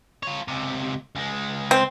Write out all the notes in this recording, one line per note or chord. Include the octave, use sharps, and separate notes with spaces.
F4 C#5
C#2 C3
C#2 G#3
C4